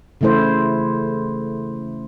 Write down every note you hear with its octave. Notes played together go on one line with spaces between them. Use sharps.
C#3 E3 A3 E4 C5